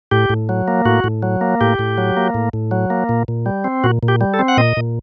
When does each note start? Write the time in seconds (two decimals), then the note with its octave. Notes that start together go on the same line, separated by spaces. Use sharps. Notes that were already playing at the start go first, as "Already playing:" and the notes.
0.11 A2 G4
0.30 A2
0.49 F#3
0.68 A#3
0.85 A2 F#4
1.04 A2
1.23 F#3
1.41 A#3
1.61 A2 G4
1.79 A2
1.98 F#3
2.17 A#3
2.34 A2
2.53 A2
2.71 F#3
2.90 A#3
3.09 A#2
3.28 A#2
3.46 G3
3.64 C4
3.84 A#2 F#4
4.03 A#2
4.08 G4
4.21 G3
4.34 A4
4.39 C4
4.48 F#5
4.57 A#2 D#5
4.77 A#2